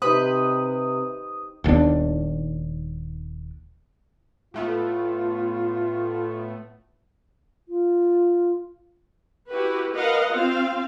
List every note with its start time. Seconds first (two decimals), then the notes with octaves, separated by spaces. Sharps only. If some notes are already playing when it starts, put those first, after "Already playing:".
0.02 C3 D#4 G4 B4 C5 D#6
1.64 D#1 D#2 B3 D4
4.54 A2 A3 B3 F4
7.69 F4
9.50 E4 F#4 G4 B4
9.95 A#4 B4 D#5 F5 F#5
10.32 C4 F4 F5